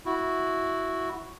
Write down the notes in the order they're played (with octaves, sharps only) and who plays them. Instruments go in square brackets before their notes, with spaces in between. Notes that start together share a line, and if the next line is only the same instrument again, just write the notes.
[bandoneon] E4 F#4